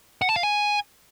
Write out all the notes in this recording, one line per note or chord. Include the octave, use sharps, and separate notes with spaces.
F#5
A5
F5
G#5